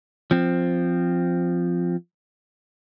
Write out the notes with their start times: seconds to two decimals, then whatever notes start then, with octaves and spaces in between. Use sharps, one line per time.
0.31 F3 C4